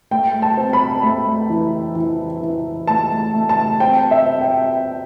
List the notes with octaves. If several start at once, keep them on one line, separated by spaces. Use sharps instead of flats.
A3 G5
A5
C4
B5
A3
E3
E3
E3
A3 A5
A3
A5
C4 G5
E5
C4
G5